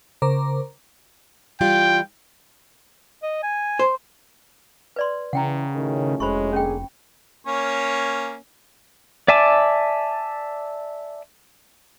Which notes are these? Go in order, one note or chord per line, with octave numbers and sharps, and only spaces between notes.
C#3 A#4 C5 A#5 D6
E3 G3 F4 G5
D#5
G#5
C5
B4 D5 C6
C#3 E3 F#5 G5 A#5
A2 D#3 F#3 C#4
F1 G#3 C5 B5 C#6
D3 A#3 C#4 G#4 G5
A#3 C#4 C#5
D5 E5 G#5 A5 D6